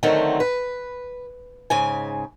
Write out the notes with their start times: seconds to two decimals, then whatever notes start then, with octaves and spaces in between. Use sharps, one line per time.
0.03 D3 D#3 F#3 A3 C4
0.40 B4
1.70 G#2 C#3 G#5